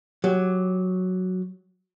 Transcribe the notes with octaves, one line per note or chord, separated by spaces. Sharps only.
F#3 G4